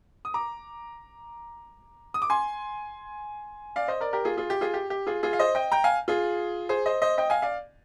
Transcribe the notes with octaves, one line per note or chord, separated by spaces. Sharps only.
D#6
A#5 D6
D#6
D6
G#5 C6
D5 F5
C5 D#5
A#4 D5
G4 A#4
F4 G#4
F4 G#4
G4
F4 G#4
G4
G4
F4 G#4
F4 G#4
F5
C5 D#5
D#5 G5
G5 A#5
F5 G#5
F4 G#4
G#4 C5
C5 D#5
C5 D#5
D#5 G5
F5 G#5
D5 F5